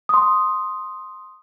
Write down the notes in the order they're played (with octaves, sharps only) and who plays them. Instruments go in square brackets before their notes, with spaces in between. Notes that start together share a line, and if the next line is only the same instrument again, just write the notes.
[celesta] C6 D#6